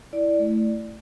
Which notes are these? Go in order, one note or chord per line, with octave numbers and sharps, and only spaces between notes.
E4 D5
A3